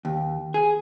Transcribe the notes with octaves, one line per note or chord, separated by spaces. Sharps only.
D#2
G#4